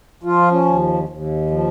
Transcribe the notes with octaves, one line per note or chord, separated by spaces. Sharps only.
F3 F4
C#4
D#2
D#2
F3